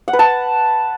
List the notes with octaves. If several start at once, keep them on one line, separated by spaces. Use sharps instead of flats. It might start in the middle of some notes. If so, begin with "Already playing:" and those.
F#5
B4
A5